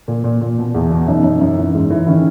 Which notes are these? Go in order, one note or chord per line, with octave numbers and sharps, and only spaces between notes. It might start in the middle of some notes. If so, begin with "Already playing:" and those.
A#2
A#2
A#2
B2
E2
B2
F#2 D#4
F#2
F#2
E3
G#2
E3
D#3 C#4 E4